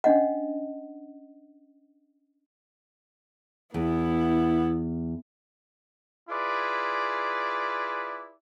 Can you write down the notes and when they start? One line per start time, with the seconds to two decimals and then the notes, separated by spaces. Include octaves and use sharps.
0.04 C#4 D4 D#5 F#5
3.74 E2 B3 E4
6.29 E4 F4 G#4 B4 D5